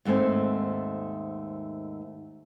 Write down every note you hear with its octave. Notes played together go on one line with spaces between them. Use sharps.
D#2 G#2 A3 C4 G#5